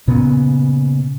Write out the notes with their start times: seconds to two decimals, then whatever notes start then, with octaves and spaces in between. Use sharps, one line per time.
0.08 A#2 C#3 B3